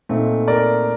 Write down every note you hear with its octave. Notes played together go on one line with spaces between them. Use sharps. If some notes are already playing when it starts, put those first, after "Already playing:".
A#2 A3 C4 D#4
A#4 D5